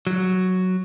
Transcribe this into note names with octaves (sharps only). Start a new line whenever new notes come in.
F#3